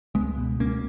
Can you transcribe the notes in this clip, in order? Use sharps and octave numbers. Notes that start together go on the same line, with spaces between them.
C#2 G#3 B3
B2
C#2 A#3 C#4